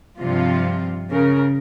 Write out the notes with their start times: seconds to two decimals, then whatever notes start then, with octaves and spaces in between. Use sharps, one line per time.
0.19 G2 C3 F3 F4
1.11 C#3 A#4